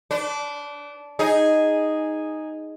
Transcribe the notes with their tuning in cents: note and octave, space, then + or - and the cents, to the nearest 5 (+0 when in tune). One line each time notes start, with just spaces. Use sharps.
D4 -20 B4 +35
D#4 +0 G#4 -5 D#5 +0